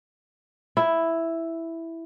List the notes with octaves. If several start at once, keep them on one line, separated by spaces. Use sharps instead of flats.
E4